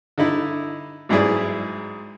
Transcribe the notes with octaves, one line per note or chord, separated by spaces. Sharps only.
D3 D#4 E4
B1 G#2 E4 G#4 D5